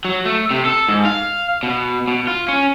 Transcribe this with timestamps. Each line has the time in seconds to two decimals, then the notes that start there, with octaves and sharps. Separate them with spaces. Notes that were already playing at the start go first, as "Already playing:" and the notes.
0.05 F#3
0.25 A3
0.51 C3
0.65 A4
0.88 G#2
1.05 F5
1.63 B2
2.08 B2
2.27 F4
2.48 C#4